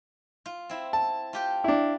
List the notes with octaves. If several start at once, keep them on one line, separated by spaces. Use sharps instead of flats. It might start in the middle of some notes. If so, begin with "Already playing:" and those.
F4
C4 E4
A5
F4 G4 G5
D4 E4